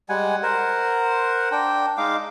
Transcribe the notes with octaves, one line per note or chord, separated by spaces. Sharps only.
G3 G#3 F#5 G#5
A#4 C5 F#5
D4 G5
G#3 D#4 F5 D6